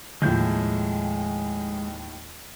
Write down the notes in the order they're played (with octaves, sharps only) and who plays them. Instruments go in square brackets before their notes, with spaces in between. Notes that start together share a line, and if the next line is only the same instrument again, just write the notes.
[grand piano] D#2 A2 F3 [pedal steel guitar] G#3 G6